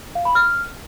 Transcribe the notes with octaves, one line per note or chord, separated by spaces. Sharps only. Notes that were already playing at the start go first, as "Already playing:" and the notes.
F5
B5
F6